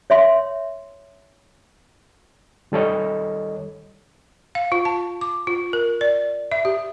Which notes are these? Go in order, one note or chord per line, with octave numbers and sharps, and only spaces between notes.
C#5 E5 C6
D#3 G3 A4 C#5 D#5
F5
F4
A5
D6
F4
A#4
D5
E5
G4